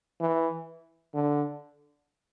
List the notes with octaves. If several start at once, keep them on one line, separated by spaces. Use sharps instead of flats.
E3
D3